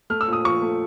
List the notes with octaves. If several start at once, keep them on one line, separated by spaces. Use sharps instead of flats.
A3 F6
E6
A#2 D#6
F3 C#6
A3